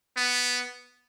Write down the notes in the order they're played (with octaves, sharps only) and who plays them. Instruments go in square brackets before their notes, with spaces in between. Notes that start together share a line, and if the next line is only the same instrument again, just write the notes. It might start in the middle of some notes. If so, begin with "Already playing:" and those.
[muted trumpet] B3